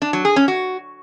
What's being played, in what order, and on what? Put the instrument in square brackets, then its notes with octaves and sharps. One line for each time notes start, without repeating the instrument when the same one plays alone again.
[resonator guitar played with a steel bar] D4
F#3
G#4
C#4
F#4